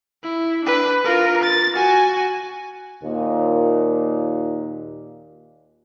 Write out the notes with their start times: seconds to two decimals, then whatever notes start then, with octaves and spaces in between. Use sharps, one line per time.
0.23 E4
0.65 D4 B4
1.04 F4 A#4
1.43 A6
1.74 F#4 G#5
3.03 D#2 A#2